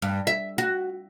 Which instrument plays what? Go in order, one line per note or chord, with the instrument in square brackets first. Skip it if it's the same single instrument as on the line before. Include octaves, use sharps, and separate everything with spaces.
[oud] G2
E5
F#4